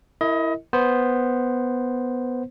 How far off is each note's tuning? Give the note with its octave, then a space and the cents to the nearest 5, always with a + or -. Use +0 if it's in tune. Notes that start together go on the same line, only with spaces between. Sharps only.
E4 +0 A#4 -30 D#5 +30
B3 +0 C5 +0